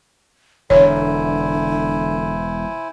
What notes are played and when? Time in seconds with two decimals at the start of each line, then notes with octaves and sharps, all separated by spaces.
0.70 E1 D3 E4 C5 C#5 G#5